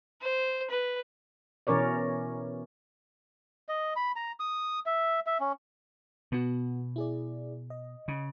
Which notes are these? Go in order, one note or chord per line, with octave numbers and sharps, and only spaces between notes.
C5
B4
B2 E3 C#4 A#4 C#5 D5
D#5
B5
A#5
D#6
E5
E5
C#4
B2 B3 F#4
E4 G#4 D5
D#5
C#3